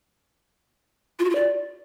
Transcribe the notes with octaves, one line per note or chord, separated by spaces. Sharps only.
F4
F#4
F4
D5